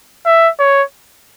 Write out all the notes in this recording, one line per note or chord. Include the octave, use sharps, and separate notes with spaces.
E5
C#5